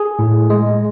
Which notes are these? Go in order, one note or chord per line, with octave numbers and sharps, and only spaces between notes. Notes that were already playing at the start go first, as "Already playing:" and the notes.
Already playing: G#4
A2
G#3